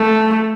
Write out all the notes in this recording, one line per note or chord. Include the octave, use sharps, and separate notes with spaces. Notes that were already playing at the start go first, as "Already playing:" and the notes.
Already playing: A3